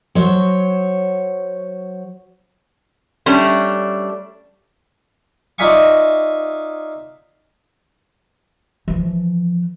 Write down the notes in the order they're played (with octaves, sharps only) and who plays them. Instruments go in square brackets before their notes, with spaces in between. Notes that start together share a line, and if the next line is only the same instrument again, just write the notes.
[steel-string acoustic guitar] F#3 C5 C#5
[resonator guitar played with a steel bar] G3 A3 C#4 D4
[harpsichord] D#4 F4 D5 E5 G#5 C#6
[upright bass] E3 F3